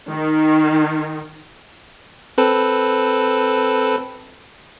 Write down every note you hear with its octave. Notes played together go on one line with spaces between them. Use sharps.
D#3
C4 A4 B4